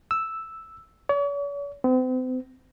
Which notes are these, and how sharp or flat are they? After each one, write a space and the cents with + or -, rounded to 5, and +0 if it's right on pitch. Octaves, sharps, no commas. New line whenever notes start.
E6 +0
C#5 +45
C4 -40